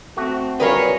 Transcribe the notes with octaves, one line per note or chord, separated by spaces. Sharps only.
A3 C4 F#4
F#3 G3 F4 G#4 A#4 B4 C#5